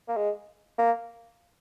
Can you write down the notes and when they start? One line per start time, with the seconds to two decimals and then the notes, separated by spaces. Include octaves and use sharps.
0.08 A#3
0.17 G#3
0.78 A#3